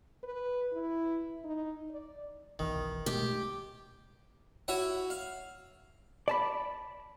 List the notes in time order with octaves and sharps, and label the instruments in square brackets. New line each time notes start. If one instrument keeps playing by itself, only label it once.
[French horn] B4
E4
D#4
D5
[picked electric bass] F#1 B1 E2 [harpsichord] D#3
[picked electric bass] B2 G#3 A3 [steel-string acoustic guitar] G4
[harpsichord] E4 F#4 C#5
F5
[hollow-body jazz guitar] D5 A5 B5